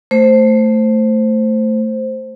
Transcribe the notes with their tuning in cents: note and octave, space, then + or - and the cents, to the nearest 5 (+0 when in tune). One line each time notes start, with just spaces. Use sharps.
A3 +10 C5 +0